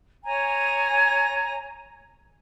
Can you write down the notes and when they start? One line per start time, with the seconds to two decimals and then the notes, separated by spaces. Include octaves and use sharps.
0.25 C#5 G#5 A#5